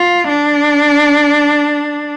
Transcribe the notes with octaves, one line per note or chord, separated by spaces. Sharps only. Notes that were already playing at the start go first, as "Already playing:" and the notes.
Already playing: F4
D4